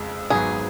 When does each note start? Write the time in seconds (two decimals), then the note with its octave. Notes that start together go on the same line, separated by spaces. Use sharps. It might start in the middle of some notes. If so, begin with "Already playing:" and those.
Already playing: F2 C#3 G#3
0.30 G#1 G#2 F#3 B3 G#4